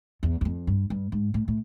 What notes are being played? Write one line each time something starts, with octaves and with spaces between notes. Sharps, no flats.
E2
E2
F2
G2
G2
G#2
A2
A2